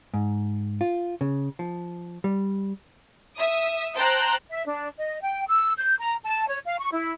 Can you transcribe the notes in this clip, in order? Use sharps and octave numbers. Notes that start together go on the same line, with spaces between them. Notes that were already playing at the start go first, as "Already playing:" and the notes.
G#2
F4
C#3
F3
G3
E5 D#6
C5 G5 A5 A#5 F#6
E5
D4
D#5
G5
E6
G6
A#5
A5
C#5
F5
C#6
E4